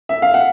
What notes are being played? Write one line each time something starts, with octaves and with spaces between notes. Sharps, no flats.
E5
F5
F#5